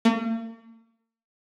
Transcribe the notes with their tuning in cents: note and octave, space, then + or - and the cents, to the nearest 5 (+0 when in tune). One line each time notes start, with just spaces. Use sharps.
A#3 -45